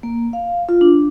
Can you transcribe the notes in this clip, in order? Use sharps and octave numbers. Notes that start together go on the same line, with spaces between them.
A#3
F5
F4
D4